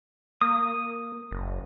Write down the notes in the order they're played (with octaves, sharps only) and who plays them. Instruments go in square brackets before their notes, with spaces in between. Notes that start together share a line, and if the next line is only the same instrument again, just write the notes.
[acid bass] A#3 [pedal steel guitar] D#6
[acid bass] F#1